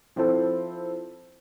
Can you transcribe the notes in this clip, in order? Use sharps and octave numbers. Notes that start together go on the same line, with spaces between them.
F3 C4 E4 A4 C5